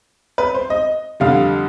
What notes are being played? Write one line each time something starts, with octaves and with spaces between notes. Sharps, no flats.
B4
C5
D#5
F2 D3 G3 F5